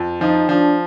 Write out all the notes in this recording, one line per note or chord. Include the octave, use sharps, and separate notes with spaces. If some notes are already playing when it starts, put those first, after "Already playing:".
Already playing: F2
F3 D#4
F3 D4